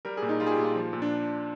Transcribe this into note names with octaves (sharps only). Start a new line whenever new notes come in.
G3 A#4
A#2 G#4
D#4
G3 F4
G#4
G4
A#2
F4
F3
A#2
D4